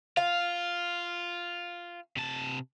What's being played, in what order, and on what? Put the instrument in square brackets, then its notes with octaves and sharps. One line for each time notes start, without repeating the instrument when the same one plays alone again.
[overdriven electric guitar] F4 [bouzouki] F5
[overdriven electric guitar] C3 A5